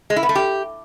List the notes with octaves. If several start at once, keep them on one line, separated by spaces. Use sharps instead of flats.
G#3
E4
B3
A3
G4